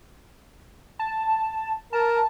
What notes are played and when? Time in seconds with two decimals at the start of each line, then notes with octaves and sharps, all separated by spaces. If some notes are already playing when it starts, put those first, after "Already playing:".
0.99 A5
1.93 A#4 A5